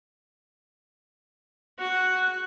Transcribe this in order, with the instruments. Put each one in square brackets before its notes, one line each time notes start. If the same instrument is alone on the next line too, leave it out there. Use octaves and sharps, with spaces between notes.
[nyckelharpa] F#4 [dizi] F#6